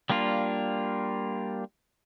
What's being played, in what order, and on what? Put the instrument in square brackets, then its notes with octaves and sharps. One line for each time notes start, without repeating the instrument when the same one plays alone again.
[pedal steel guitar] G3 A#3 D4 F4